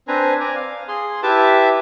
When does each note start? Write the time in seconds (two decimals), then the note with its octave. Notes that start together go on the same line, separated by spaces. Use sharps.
0.08 C4 D4 B4 C5 G#5 A#5
0.40 D5 G#5 A#5
0.56 F5
0.88 G#4 C6
1.23 E4 G4 B4 E5 A5 D6